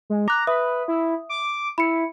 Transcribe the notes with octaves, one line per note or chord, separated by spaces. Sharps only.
G#3
A#5 D6 F#6
B4 E5 D#6
E4
D6
E4 B5 C#7